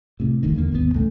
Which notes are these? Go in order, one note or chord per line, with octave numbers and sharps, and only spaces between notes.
A2 C3
G1 D2 D#3
E2 D3 D#3 A#3
G#1 D#2 D#3 B3
A1 D2 C#3 A3